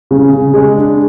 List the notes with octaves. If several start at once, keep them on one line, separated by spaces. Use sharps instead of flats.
C#3
C#3
G#3
D4